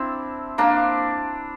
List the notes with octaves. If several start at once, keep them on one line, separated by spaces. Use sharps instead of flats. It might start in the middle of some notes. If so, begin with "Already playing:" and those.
Already playing: C4 D4 E4
A#3 D4